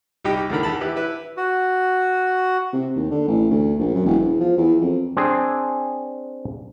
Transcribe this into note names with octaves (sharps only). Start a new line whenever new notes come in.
C2 D#4 G4 G5
E2 A2 D3 D#3 A#4 B5
E2 D#3 A5 B5
E4 G4 B4
E4 B4
F#4
C3
D#2
D3
A1
D2
A#1
F#2
E1
E2
F3
E2
F2
C4 D4 G#4